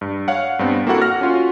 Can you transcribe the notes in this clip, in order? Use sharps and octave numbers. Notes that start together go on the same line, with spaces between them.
G2
C#5 F5 F#5
G2 B3 C4
A#3 C4 E4 F#4 A4 F#5
F#5 F6 A#6
C#4 F4 F#4